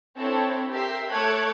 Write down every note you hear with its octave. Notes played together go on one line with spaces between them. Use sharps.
C4 D4 E4 A4 C#5
G4 A#4 E5 C6
A3 A4 C#5 D6 F#6 G#6